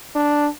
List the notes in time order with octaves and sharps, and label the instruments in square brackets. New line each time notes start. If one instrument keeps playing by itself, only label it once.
[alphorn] D4